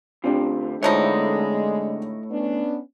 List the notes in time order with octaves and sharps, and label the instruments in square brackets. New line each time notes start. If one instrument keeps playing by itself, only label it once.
[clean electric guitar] D2 F4 [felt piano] C4 D4 G4
[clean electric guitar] A2 C#5 [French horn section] D3 G#3 [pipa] E3 F3 D#4
[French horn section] B3 C#4 D4